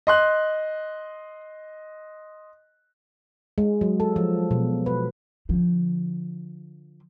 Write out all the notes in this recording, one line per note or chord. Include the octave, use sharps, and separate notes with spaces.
D#5 C6 F#6
G#3
F#3
A4
F3
B2
B4
D3 F3